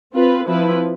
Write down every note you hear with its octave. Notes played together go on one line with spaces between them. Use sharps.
C4 F4 B4
F3 C4 E4 B4